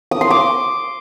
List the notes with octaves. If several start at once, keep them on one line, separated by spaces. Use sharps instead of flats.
D#6
C6
D6